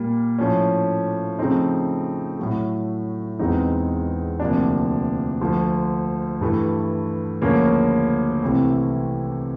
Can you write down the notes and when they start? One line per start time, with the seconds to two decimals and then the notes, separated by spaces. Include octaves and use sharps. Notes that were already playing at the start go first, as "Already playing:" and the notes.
Already playing: A#2 G3 A#3
0.39 A2 F3 A3 C#4
1.39 C#3 F3 A3 C4 D#4
2.39 A2 F#3 A3
3.39 E2 B2 G#3 C4 D#4
4.40 D2 C3 F3 A#3 D4
5.41 D2 D3 F3
6.41 G2 E3 A3
7.42 D2 C#3 F3 A#3 C#4
8.42 C2 C3 E3 A3 C4